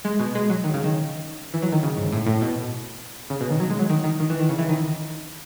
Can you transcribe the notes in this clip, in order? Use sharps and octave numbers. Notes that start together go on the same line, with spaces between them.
G#3
B2
G#3
F#3
D#3
C#3
D#3
E3
F#3
D#3
C#3
G#2
A2
A2
B2
C#3
B2
D#3
F#3
G#3
F#3
D#3
D#3
D#3
E3
D#3
C#3
E3
D#3